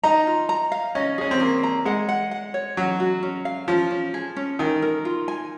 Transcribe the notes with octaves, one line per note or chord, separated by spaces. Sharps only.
D#4 A#5
F4
A#5
F5
C#4 D#5
C#4 G#4
C4
A#3 G#4
A#5
G#3 F#5
F#5
F#5
C#5
F#3 C#4
F#4
C#4
F5
F3 C#4
C#4
G#4
C#4
D#3 G#5
A#4
F4
G#5